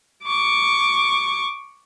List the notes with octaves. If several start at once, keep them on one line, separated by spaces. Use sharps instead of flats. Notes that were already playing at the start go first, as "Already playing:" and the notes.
C#6 D6